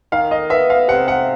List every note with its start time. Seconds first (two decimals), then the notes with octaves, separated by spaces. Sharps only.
0.12 D#3 F5
0.31 D#5
0.50 B3 E5
0.70 F5
0.88 C3 F#5
1.08 F#5